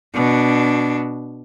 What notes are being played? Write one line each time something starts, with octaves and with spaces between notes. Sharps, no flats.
B2 D4